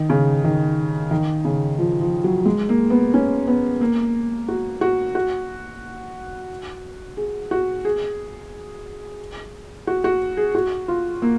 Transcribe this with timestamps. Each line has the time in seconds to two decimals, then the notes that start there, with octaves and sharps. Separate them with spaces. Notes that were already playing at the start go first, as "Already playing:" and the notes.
Already playing: D#3
0.10 C#3
0.44 D#3
1.11 D#3
1.45 C#3
1.79 F3
2.01 F3
2.24 F#3
2.46 G#3
2.69 A#3
2.90 B3
3.14 C#4
3.48 B3
3.81 A#3
4.48 F#4
4.81 F#4
5.15 F#4
7.17 G#4
7.51 F#4
7.85 G#4
9.87 F#4
10.04 F#4
10.37 G#4
10.55 F#4
10.88 F4
11.22 A#3